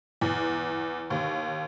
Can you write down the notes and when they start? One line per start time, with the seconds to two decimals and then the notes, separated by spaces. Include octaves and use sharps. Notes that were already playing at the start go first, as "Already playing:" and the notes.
0.21 E2
1.10 D#2